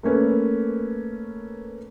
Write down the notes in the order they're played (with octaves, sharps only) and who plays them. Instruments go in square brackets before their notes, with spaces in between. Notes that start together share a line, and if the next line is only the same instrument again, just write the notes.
[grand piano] A3 A#3 C#4 B4